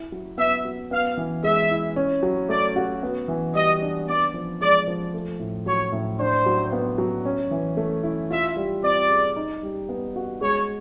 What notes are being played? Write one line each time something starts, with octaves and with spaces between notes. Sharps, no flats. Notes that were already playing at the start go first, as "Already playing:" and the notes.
Already playing: E4
F#3
B3 E5
F#3
B3 F5
E3
G#3 E5
E4
C#4
F#3
A3 D5
F#4
B3
E3
G3 D#5
D4
B3 D5
F3
G#3 D5
F3
A3
A2
F#3 C#5
A2
D4 C5
F#3
B3
F#3
C#4
E3
A3
E4
F4 E5
G3
C4 D5
G#4
D#4
G3
B3
F#4
G#3 C#5